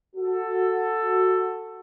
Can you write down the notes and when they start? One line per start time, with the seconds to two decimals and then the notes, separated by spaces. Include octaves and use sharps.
0.16 F#4 A4